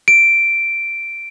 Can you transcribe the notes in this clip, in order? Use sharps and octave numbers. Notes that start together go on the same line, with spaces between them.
D7